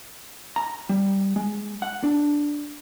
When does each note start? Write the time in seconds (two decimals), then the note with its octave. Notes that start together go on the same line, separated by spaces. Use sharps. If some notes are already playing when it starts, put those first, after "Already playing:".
0.56 A#5
0.89 G3
1.36 G#3
1.82 F#5
2.03 D4